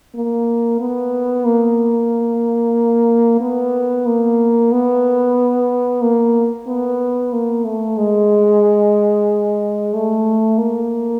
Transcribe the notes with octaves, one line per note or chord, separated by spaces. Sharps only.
A#3
B3
A#3
B3
A#3
B3
A#3
B3
A#3
A3
G#3
A3
A#3